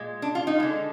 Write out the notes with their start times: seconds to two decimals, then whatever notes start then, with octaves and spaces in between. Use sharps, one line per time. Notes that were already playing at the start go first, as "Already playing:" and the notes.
Already playing: A#2 G#3
0.22 D4
0.35 F4
0.47 D#4
0.60 D3 G#3